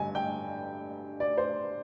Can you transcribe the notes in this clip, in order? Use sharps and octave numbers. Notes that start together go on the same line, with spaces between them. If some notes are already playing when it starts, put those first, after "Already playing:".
Already playing: G2 D3 G#5
G5
D5
C5